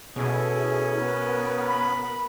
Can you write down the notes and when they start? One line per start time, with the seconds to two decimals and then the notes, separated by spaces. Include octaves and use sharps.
0.16 B2 C#4 E4 G#4 A4
0.98 B3 A#4 B4
1.67 B5